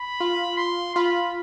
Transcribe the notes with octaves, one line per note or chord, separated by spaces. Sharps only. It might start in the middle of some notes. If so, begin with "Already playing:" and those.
Already playing: B5
F4
C6
F4 B5